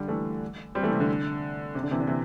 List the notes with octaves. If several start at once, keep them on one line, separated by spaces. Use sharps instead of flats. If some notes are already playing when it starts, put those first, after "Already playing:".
Already playing: D3 G3
E3 A3
G3 C4
E3 A3
C3
D3
C3
D3
C3 E3
D3
C3 E3